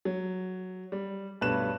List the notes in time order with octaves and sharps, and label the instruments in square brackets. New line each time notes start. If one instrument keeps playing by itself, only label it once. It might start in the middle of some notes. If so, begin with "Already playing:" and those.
[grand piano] F#3
G3
B1 G2 A3 B4 F#6 E7